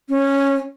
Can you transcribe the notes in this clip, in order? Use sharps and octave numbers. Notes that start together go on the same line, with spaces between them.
C#4